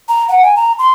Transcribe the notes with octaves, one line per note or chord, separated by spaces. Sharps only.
A#5
F#5
G#5
A#5
C6